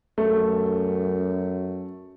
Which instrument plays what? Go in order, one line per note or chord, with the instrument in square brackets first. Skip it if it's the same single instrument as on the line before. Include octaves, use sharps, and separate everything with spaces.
[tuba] F#2 [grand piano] A3